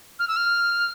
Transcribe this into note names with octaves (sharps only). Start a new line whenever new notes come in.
F6
E6
F6